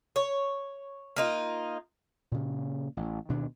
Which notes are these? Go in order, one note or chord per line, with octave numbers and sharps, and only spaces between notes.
C#5
A#3 D#4 F4
A#2 C#3
A1
D2 B2 D#3 D4